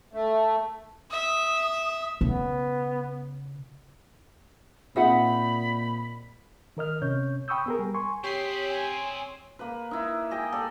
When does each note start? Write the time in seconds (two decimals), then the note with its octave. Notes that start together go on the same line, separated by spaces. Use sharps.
0.13 A3
1.11 E5 D#6
2.21 C#3 B3
4.96 A#2 C4 D#4 F4 G#4 E5 F#5 B5
6.77 D#3 A#4 D#5 F6
7.02 C3 C#4 C#5 G6
7.48 G5 B5 C#6 D#6 E6 G6
7.66 B3 G#4 A#4
7.79 G3
7.94 G#5 C6 C#6
8.24 C4 G4 G#4 C#5 C6 B6 C7
8.69 G#5
9.59 A#3 B4
9.91 D#4 E4
10.31 G#4 D#5 G5
10.52 A#3 G4 A4 D5